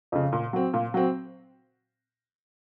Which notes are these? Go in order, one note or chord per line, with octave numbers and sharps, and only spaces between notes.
F2 C#3
A#2
F#3 C4
A#2
F#3 C4